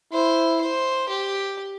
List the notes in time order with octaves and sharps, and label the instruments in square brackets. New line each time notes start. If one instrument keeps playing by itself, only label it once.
[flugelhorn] E4 [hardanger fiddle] C5
[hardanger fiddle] C5
G4